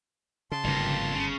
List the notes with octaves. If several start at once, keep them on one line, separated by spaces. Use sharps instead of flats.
C#3 A5 C6
G1 F2 G#2 C#3 A#3
C#3